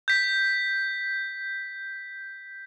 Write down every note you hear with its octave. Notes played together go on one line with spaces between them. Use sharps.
G6 B6